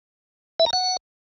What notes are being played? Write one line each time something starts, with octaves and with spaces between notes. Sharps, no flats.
E5
A#5
F#5